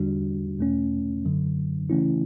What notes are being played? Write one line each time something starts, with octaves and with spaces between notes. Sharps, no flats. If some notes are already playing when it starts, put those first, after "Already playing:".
Already playing: E2 D3 G3 D4 F#4
E2 B2 A3 C#4
F#2 D3 F#3
C#3 E3 A3 C#4 E4